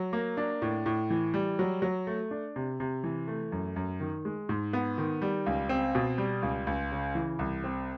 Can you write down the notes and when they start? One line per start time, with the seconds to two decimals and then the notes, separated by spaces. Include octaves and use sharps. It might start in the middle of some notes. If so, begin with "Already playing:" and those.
Already playing: F#3
0.13 A#3
0.37 D4
0.62 A2
0.86 A2
1.10 E3
1.34 G3
1.59 F#3
1.82 F#3
2.07 A3
2.31 D4
2.56 C3
2.80 C3
3.04 E3
3.28 A3
3.52 F#2
3.76 F#2
4.00 D#3
4.25 G#3
4.49 G#2
4.73 B3
4.98 D#3
5.22 G3
5.46 C#2
5.69 C4
5.95 B2
6.18 G3
6.42 C#2
6.67 C#2
6.92 C#3
7.15 E3
7.39 C2
7.64 C4